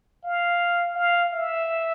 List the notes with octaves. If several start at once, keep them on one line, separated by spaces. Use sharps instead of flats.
F5
F5
E5